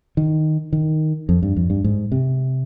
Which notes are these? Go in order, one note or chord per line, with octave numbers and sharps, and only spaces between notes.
D#3
D#3
F2
G2
F2
G2
G#2
C3